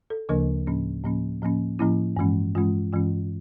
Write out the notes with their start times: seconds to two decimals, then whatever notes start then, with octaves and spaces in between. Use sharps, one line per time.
0.10 A4
0.29 D2 C#3 F3 A#3 D4 A#4
0.67 A2 F3 A#3 C#4
1.04 A2 F3 A#3 C#4
1.42 A2 F3 A#3 C#4
1.79 A2 F3 A#3 C#4 E4
2.17 G2 E3 G#3 C#4
2.55 G2 E3 G#3 C#4 F4
2.93 G2 E3 G#3 C#4 F4